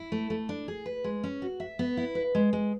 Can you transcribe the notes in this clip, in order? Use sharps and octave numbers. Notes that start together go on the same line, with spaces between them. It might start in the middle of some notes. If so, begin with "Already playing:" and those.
Already playing: E4
A3
A3
D4
G#4
B4
G#3
C#4
F#4
E5
B3
E4
B4
G#3
G#3